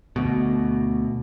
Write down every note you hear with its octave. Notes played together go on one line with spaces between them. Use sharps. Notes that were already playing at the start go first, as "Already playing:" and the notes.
D2 B2